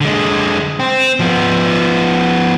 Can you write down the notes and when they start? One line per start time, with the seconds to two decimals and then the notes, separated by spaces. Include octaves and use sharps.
0.01 D3 G#3
0.80 C4
1.20 F3 B3